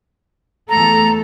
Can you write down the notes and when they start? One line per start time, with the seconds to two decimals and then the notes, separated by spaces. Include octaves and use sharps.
0.69 E2 A3 A4 A#5